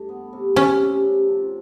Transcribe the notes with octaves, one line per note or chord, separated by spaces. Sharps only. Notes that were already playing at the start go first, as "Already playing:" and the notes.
Already playing: G2 A3
B3
C3
C3 C#4
C3
C3
F3